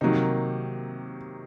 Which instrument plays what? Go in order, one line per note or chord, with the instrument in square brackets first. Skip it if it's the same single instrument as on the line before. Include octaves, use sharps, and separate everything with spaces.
[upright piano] C3 [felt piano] D#3 F#3 A#3 D#4